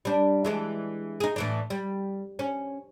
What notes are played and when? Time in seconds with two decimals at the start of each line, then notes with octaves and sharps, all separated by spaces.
0.05 G3 D4
0.45 E3 G#3 D4
1.20 D#4 G#4
1.36 A2 E3 D4
1.70 G3
2.39 C#4